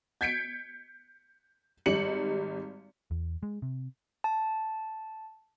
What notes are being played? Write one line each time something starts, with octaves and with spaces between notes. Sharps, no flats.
G6 G#6 B6 C#7 D7
G#1 G3 D#4 C#7 F#7
E2
G#3
C3
A5